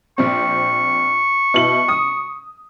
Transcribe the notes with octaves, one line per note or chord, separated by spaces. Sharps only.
A#1 C4 C#6
B2 E4 F#7
D#6